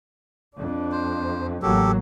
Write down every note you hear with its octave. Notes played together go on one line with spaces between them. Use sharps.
F2 D4
C5
A1 F#3 A#3 G4 A4